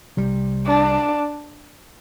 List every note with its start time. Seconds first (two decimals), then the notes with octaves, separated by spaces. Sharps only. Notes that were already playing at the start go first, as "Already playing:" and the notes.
0.17 C2 C3 G3
0.67 D4